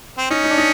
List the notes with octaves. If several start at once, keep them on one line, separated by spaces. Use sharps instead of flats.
C4
C#4 D#4
D#4
D4
D#4